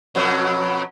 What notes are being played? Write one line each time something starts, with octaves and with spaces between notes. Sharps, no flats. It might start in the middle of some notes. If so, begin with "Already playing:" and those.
F2 B2 F#3